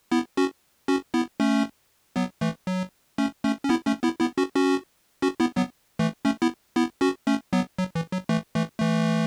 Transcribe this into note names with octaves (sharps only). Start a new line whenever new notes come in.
B3 E4
C#4 F#4
C#4 F#4
B3 E4
A3 C#4
F#3 B3
E3 A3
F#3
A3 C#4
A3 C#4
C#4
B3 E4
A3 C#4
B3 E4
B3 E4
C#4 F#4
C#4 F#4
C#4 F#4
B3 E4
F#3 B3
E3 A3
A3 C#4
B3 E4
B3 E4
C#4 F#4
A3 C#4
F#3 B3
F#3
E3
F#3
E3 A3
E3 A3
E3 A3